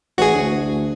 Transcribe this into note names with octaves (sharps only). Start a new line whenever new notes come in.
A1 F#4 G#4
D2